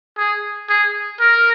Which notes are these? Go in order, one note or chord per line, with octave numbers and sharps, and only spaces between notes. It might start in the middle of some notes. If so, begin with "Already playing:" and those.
G#4
G#4
A#4